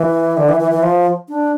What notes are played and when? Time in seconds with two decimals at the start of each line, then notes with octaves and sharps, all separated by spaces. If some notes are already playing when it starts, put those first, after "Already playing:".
Already playing: E3
0.37 D3
0.49 E3
0.60 E3
0.71 E3
0.83 F3
1.29 D4